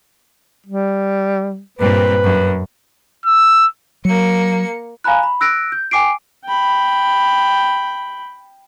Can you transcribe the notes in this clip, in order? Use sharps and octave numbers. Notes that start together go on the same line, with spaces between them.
G3
G2 A#2 C4 B4
F#2
E6
F#3 A#3 C#7
F5 G#5 A#5 B5 F#6
B5
E6 F#6 A#6 D7
G6
G5 G#5 D6 C7 D7
G5 B5